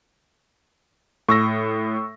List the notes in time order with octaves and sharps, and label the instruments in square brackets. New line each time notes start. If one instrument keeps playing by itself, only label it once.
[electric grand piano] A2 [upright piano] C#6 E6 A#6